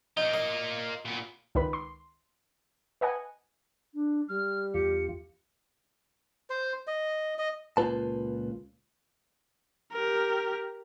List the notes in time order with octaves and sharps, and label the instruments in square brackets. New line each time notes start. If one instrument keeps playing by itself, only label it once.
[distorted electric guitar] A#3 F4 [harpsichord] D#4
[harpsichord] D#5
[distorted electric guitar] A#2 B3
[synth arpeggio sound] C#2 D#3 B4 B5
C6
B4 D#5 F#5 G#5
[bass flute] D4
[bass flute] G3 [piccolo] F6
[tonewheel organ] E2 F4 [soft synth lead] G4 [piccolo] C#7
[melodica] C5
D#5
D#5
[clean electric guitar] C#2 A#2 F4 B4 A5
[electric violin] G4 A#4